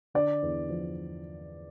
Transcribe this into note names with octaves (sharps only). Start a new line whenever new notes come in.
D3 D5
E2
F3